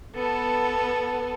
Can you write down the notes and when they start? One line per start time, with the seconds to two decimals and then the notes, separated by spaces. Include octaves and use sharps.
0.15 B3 A4